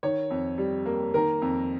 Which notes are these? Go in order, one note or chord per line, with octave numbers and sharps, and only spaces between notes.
D#3 C#5
F2
G3
A#3
D#3 A#4
F2